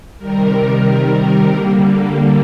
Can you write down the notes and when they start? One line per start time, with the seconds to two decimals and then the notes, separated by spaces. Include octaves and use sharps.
0.19 C3 D#3 G3 A#4
1.50 D3 G3 A#3